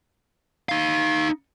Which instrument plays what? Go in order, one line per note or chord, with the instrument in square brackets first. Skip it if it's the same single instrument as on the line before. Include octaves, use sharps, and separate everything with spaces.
[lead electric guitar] D#4 F5